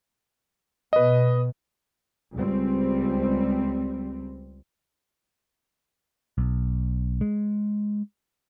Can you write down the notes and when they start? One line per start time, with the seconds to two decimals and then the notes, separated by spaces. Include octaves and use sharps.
0.93 B2 B4 D#5
2.34 C#2 G3 C4
6.38 B1
7.21 G#3